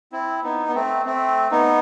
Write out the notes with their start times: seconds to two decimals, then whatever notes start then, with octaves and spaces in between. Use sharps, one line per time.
0.12 C4 E4
0.43 B3 D#4
0.68 B3
0.75 A3 C4
1.06 A3 C4
1.51 B3 D#4